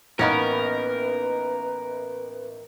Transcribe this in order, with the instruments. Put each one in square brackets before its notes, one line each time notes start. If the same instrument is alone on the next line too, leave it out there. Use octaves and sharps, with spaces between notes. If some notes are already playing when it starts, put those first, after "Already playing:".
[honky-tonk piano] A1 D#4 B5 [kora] A#3 B3 C#4 [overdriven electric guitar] A#4 [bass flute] B4